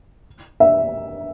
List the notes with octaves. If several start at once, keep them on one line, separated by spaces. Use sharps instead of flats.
E5